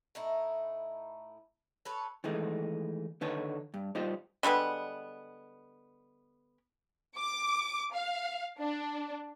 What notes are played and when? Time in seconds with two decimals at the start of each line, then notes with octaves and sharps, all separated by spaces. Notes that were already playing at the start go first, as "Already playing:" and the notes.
0.15 A2 D#4 E4
1.85 A4 B4 C#5
2.24 D#3 E3 G#3 A3 D#4
3.21 D3 D#3 D#4 B4 C#5 A5
3.74 G2
3.95 G3 D#4 F4 G4 C5 D#5
4.43 D3 G3 G#3 B3
7.17 D6
7.93 F5
8.58 D4